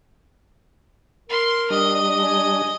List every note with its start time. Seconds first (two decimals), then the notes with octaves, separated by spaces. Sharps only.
1.29 A#4 C6
1.70 G3 D4 D#5
2.19 G#5